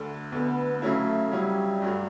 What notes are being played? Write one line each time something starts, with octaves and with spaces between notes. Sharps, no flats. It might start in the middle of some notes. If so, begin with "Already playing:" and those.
Already playing: D2 D3 A3
D2 D3 A3 B3
C#3 F#3 A3 C#4 E4
C#3 F#3 G3 C#4 E4
G2 F#3 A3